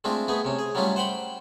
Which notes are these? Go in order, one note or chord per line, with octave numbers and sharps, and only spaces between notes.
G#3 A3 C4 D4 F4
A3 B3 G#4
C3 C#4
G#4
F#3 G3 A3 C#4 F4
C5 F#5 G5 B5 C6